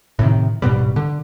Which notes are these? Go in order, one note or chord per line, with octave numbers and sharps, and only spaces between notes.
A2 C3 D#3
D1 G#2 B2 G3
D3